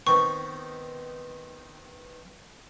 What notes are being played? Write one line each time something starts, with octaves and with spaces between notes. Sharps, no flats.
D#3 B3 C4 C#6